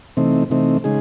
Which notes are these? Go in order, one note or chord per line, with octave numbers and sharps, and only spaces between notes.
C3 E3 A3 C4 D#4
C3 E3 A3 C4 D#4
C#3 G#3 D#4 G#4